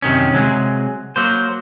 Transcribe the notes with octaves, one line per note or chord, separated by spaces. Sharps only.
F#2 C3 D#3 C#4
C3 F#3 G#3 G#4
F#3 A#3 C5